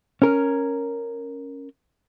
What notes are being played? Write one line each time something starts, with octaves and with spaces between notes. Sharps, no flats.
C#4 A#4